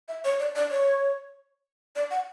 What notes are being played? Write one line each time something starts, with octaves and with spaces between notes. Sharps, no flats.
E5
C#5
D5
D5
C#5
D5
F#5